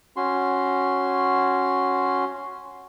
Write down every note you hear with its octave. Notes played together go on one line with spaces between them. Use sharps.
C#4 F#4 C6